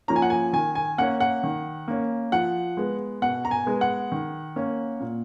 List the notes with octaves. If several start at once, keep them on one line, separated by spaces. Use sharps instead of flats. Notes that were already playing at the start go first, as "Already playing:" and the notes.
F3 A#3 C#4 A#5
G#5
F#5
G#5
D#3 G#5
G#5
A#3 C#4 F#5
F#5
D#3
A#3 C#4
F3 F#5
G#3 B3
B2 F#5
A#5
G#5
G#3 B3
F#5
D#3
A#3 C#4
A#2